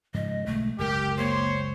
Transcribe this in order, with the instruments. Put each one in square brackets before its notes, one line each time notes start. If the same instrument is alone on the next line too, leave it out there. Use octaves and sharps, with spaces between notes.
[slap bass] G#2 C#3 F3 [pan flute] D#5
[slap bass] B1 D3 G#3 [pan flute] A3
[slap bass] F#1 C#2 C#3 [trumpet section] G4 [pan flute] A#4
[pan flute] A#3 [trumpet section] C5 C#5 C6